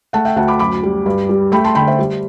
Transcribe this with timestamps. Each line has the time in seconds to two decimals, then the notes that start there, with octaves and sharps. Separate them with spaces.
0.13 A3 F#5 A5
0.25 E5 G5
0.36 D2 F#5 A5
0.48 B5 D6
0.59 F#2 B5 D6
0.83 G3
1.06 G2
1.29 G3
1.52 A3 G5 B5
1.64 A5 C6
1.75 D3 G5 B5
1.87 C5 E5
1.99 G3